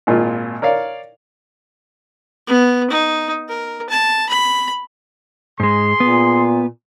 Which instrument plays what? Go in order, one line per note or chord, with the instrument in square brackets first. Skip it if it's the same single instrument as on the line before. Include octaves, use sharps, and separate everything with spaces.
[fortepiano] G#1 A#2 F4
A#4 C#5 D5 F5
[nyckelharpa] B3
D#4
A#4
A5
B5
[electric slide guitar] G#2 G#3 [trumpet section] G#4 C6
[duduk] A#2 [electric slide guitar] B3